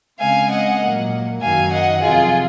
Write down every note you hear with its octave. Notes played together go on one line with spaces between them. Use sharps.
C#3 G#3 C4 F5 G#5
D#5 F#5
A#2 F#3 A#3
F#2 D#3 F#3 F5 G#5
D#5 F#5
F2 C3 F#3 C4 F4 G#4